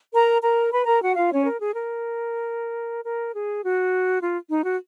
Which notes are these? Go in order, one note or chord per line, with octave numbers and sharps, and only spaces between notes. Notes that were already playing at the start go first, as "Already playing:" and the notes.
A#4 A#5
A#4 A#5
B4 B5
A#4 A#5
F#4 F#5
F4 F5
C#4 C#5
A#4
G#4
A#4
A#4
G#4
F#4
F4
D#4
F#4